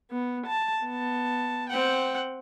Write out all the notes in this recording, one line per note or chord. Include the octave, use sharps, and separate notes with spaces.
B3
A5
B3 A5
C4 F#5 G5